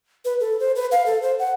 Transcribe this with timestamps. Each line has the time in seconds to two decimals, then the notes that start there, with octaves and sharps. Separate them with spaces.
0.25 B4
0.40 A4
0.60 C5
0.76 B4
0.91 F5
1.06 A4
1.22 C5
1.39 F#5